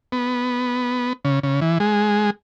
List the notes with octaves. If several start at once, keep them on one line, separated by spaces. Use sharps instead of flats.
B3
C#3
C#3
E3
G#3